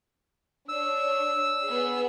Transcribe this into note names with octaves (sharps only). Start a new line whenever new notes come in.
D4 C#5 E6
B3 G#4